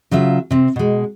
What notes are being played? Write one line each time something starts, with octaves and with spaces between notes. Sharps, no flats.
C#3 F#3 F4 E5
C3 C4
B2 G#3